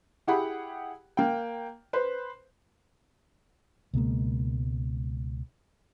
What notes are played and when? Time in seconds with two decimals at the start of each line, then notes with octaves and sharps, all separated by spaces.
0.27 E4 G4 G#4 F#5 G5 B5
1.17 A#3 G5
1.93 B4 C5
3.94 C#2 B2 G#3 A#3